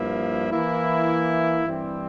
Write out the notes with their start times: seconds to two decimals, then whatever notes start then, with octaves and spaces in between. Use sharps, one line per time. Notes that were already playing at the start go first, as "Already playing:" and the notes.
Already playing: G2 F3 A#3 E4
0.50 E3 A#3 E4
1.66 G2 E3 G3 C4